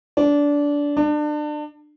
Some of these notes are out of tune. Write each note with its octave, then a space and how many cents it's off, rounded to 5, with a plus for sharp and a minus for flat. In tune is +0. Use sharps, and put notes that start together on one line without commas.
D4 -20
D4 +30